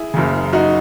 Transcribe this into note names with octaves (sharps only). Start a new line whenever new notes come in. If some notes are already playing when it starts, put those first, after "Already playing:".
Already playing: E4 G#4
F#1 F#2 C#3
D#4 F#4